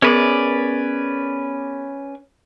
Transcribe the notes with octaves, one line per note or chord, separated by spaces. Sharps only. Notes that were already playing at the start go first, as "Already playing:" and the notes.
B3 C#4 G#4 A#4 B4 D5